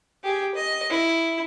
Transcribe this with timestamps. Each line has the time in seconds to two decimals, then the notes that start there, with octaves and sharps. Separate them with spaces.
0.24 G4 G#4
0.55 D#5
0.90 E4